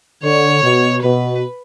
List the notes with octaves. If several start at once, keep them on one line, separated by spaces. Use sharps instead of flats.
D3 C#5
B2
B2 B4